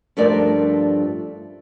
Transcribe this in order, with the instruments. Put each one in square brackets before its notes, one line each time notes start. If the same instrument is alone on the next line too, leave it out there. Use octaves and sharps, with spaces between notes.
[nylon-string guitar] G2 F3 A3 D4 A#4 D5